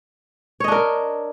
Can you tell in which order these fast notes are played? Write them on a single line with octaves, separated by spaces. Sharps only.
C#5 D#5 D4 A#4